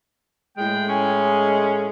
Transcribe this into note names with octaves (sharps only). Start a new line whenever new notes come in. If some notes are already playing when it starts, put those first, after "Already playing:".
A2 G#3 G5
C#4